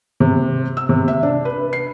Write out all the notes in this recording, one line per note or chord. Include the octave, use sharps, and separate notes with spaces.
C3
E6
C3
E5
D4
B4
C7